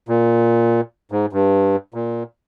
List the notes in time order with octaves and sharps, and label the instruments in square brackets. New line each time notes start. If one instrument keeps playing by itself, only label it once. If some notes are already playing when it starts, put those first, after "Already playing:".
[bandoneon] A#2
G#2
G2
A#2